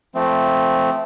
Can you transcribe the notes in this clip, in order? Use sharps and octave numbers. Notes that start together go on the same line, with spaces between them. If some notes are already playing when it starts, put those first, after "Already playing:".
F3 A3 C4